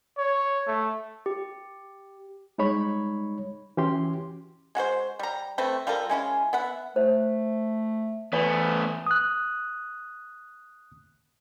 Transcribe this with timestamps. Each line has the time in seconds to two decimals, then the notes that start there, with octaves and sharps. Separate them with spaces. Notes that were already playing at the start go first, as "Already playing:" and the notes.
0.18 C#5
0.67 A3
1.26 G4
2.58 G3 G#3 D#4 C#5 B5 C#6
3.77 E3 C#4 F#4 G4 C6
4.75 G#3 F#4 A#4 C5
5.19 G3 A#5
5.58 A3 C4 B4 C5
5.87 G3 F4 A4 A#4
6.10 G#3 C#4 E4 F4
6.53 B3 E5 F#5
6.96 A3 C5
8.33 E3 A3 B3 D5
9.07 D#6 F#6